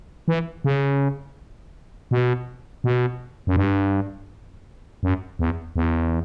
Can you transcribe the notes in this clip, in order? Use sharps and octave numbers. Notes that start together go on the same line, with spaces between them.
E3
C#3
B2
B2
F#2
G2
F#2
E2
E2